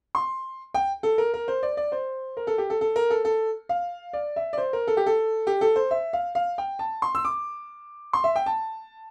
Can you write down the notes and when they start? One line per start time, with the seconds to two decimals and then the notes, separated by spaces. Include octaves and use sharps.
0.15 C6
0.74 G5
1.03 A4
1.18 A#4
1.34 A#4
1.48 C5
1.63 D5
1.77 D5
1.92 C5
2.37 A#4
2.47 A4
2.58 G4
2.70 A4
2.81 A4
2.96 A#4
3.10 A4
3.25 A4
3.69 F5
4.13 D5
4.36 E5
4.53 D5
4.58 C5
4.73 A#4
4.88 A4
4.97 G4
5.06 A4
5.47 G4
5.61 A4
5.76 C5
5.91 E5
6.13 F5
6.35 F5
6.58 G5
6.79 A5
7.02 C6
7.15 E6
7.25 D6
8.13 C6
8.24 E5
8.36 G5
8.46 A5